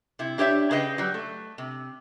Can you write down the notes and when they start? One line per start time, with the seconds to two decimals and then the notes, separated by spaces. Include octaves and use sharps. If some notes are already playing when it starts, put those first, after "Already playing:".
0.19 C3 E4
0.38 D4 G4 C#5 D5 E5
0.71 C#3 G#4 B4 D#5 G5
0.98 F#3 G3
1.14 A3
1.58 C3